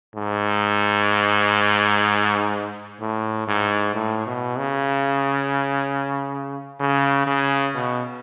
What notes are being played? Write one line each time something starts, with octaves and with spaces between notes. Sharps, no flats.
G#2
A2
G#2
A2
B2
C#3
C#3
C#3
B2